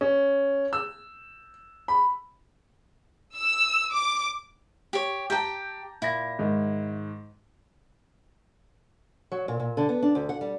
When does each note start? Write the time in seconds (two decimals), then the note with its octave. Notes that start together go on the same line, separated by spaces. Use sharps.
0.01 C#4
0.73 E6
1.88 B5
3.35 E6
3.91 D6
4.93 G4 C#5
5.30 G4 G5 A5 A#5 G6
6.02 A#2 E4 A#6
6.39 G#2 D#3
9.32 F#3
9.48 A#2
9.60 A#2
9.77 D3
9.89 B3
10.02 D4
10.15 D2
10.29 F#5
10.41 G3